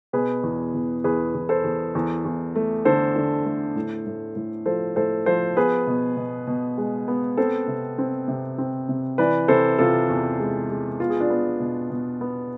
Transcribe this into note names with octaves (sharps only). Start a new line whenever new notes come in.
B2 G#4 B4
E2
E2
E2 G#4 B4
E2
A4 C5
E2
E2
E2
A3
D3 A4 C5
D3
A3
A2
A2
A2
F3 A4 C5
A2 A4 C5
F3 A4 C5
B3 G#4 B4
B2
B2
B2
G#3
B3
C4 A4 C5
C3
C4
C3
C4
C3
E3 B4 D5
C3 A4 C5
C3 F4 A4
E2
G#3
G#3
B3 F4
G#4
D4 F4
B3
B2
B2
B3